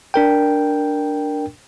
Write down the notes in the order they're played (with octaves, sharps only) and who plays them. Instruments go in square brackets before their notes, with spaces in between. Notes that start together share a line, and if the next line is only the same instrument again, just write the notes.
[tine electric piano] D4 A#4 G5